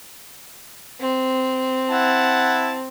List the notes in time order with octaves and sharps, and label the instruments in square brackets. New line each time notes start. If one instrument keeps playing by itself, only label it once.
[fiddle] C4
[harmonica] E4 F#5 A5